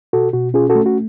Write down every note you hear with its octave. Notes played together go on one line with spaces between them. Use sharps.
B2 F#4 A4
B2 F#4
C#4 F4 G#4
F#4 A4
A3
F#4